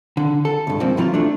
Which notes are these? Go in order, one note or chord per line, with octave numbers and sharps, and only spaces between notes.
D3
A4
C#2 G2
G#2 C3 F3 A#3 C4
C3 E3 F#3 F4
A3 D4